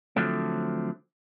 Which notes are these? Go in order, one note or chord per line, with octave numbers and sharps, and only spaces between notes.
D3 F3 F#3 A3 C4